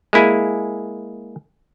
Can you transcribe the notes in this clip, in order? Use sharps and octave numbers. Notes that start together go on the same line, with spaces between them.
G#3 A#3 E4 G#4 G#5